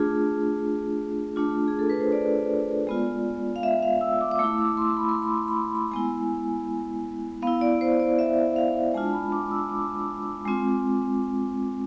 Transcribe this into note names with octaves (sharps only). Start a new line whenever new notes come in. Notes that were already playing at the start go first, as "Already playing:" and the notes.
Already playing: A3 D4 F4 G#4
A3 D4 F4
G#4
A4
B4
C5
D5
G#3 B3 F4
F5
E5
F5
E6
D6
D6
A3 E4 E6
D6
C6
B5
C6
B5
C6
B5
C6
B5
G#3 B3 E4 G#5
B3 E4 F5
D5
C5
D5
E5
F5
G#3 D4 F4 A5
B5
D6
E6
D6
G#3 C4 F4